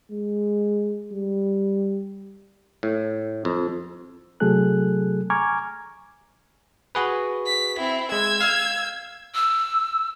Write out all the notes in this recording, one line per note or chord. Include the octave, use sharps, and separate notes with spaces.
G#3
G3
A2
F2
C3 F#3 A3 G#4 A4 F#6
G#5 A#5 C#6 D6 F6 G#6
F#4 G#4 B4
B6
C4 E4
G#3 E6 G#6
F5 F6
E6